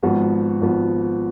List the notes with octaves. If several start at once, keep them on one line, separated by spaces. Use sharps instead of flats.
G#1 G#2 F3 B3 F#4
G#1 G#2 F3 B3 F#4